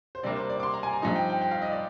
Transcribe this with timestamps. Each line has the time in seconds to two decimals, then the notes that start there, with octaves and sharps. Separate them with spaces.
0.15 C5
0.23 C3 G3 A#3 D4 D5
0.36 C5
0.50 D5
0.60 D6
0.63 C6
0.74 A#5
0.83 G#5
0.93 A#5
1.02 G2 F3 C4 D#4
1.16 G5
1.29 G5
1.41 G5
1.51 F5
1.62 D#5
1.72 D5